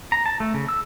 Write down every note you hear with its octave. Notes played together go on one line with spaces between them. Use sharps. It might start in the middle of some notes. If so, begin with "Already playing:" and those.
A#5
A5
A3
C#3
E6